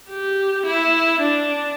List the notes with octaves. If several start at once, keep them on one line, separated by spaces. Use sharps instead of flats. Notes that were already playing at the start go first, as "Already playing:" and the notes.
G4
E4
D4